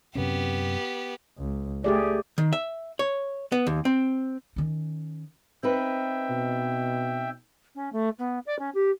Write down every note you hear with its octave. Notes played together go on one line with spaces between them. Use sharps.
F#2 C3 B3 C#4 G4
C#2
A3 G4 G#4 D5
D#3
E5
C#5
B3
D#2
C4
D#3 C#4
C4 D#4 B4 E5 G5
B2
C#4
A3
B3
D5
C#4
G4